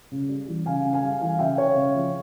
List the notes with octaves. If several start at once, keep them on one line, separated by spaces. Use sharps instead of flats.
C#3
G3
E3
C#3 F5 G#5
C#3
F5 G#5
G3
E3 F5 G#5
C#3 E5 G5
C#3 C#5 F5
C#3
F3